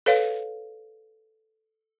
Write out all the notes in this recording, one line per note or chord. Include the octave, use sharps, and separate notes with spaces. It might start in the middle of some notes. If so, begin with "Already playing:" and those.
A4 B4 C#5 F5